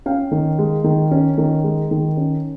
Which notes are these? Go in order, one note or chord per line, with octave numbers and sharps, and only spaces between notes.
C#4 F5 G5
D#3
G#3
D#3
C#4
D#3
G#3
D#3
C#4